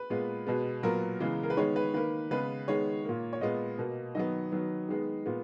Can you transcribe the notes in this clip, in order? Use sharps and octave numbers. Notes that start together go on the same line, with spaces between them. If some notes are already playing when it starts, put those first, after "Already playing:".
Already playing: B4
A#2 G#3 B3
B2 G#3 B3
A#2 F#3 B3 A#4
C#3 E3 G#3 B3
A#4
B4
D#3 G#3 B3 C#5
B4
D#3 A#3 B4
C#3 G#3 B3 B4
D#3 G#3 B3 C#5
A#2 A#3
C#5
A#2 G#3 B3 D#5
B2 A#3
D#3 F#3 B3 D#5
D#3 F#3 B3
D#3 G#3 B3
A#2 G#3 B3